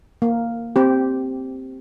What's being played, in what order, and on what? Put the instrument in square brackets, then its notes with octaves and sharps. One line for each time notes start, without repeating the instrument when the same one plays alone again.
[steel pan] A#3
C4 G4